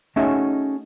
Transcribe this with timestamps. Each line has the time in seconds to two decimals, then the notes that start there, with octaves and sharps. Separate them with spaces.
0.16 A3 C#4 D#4 F#4 G#4 E5